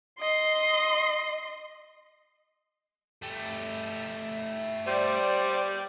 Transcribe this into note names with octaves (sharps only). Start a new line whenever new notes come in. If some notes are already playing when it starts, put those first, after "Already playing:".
D#5 C6
A3 G4
G3 C5 D5